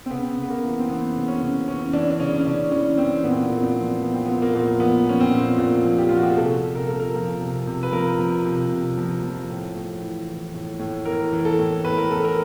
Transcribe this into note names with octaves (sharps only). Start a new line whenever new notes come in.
C4
C#3 B3
C#3
B3
A#3
E3
C4
E3 B3
C#3
C#4
C#3
E3 C#4
E3 D4
D4
C#3 C#4
C#3 D4
E3 C#4
E3 C4
A#2 B3
C4
B3
A#2
C4
F3
F3 B3
C4
A#2 B3
A#3
A#2 A#3
F3 B3
F3 C#4
C4
A#2
A#2
F3
G4
F3 F4
F#4
G4
G#4
C3 A4
C3
A#4
F3 A4
A#4
F3
C3
C3
B4
F3 A#4
F3
C3
C3
F3
F3
A2
A2
E3
E3
A2
A2
E3 A#4
E3
A4
A2
A2 B4
A#4
E3 A4
A#4